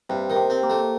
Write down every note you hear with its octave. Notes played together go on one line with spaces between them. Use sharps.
G2 C3
D#3
C3
C4
A#3
A3